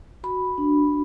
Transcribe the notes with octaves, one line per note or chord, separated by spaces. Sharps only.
F#4 B5
D4